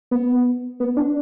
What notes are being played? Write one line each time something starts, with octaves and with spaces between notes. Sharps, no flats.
B3
B3
D4